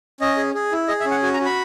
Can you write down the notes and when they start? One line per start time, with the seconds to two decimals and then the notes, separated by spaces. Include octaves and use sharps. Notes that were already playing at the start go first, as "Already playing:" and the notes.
0.20 C#4 D#5
0.37 G#4
0.54 G#4
0.72 E4
0.88 G#4 D#5
1.00 E5
1.05 C#4
1.11 F#5
1.23 F#4 G#5
1.34 A#5
1.40 F#4
1.45 B5